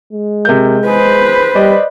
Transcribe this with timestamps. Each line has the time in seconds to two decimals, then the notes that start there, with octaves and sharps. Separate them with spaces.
0.13 G#3
0.45 C3 A#4 G6
0.86 G#4 B4 C5
1.55 G3 D5 D#5